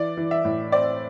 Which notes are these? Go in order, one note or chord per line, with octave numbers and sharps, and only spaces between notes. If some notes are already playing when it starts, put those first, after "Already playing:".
Already playing: E3 D5
E3
E5
A2
C4 D5